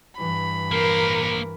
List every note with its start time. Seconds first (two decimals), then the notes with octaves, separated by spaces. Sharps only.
0.18 G2 E3 B5
0.72 A#3 A#4 C5